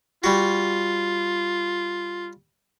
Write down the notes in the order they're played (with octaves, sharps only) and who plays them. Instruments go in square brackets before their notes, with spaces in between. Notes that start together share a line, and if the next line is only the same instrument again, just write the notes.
[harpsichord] G3 F#4 [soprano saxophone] F4